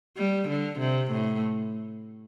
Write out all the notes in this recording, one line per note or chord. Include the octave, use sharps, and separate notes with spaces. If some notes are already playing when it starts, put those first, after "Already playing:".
G3
D3
C3
A2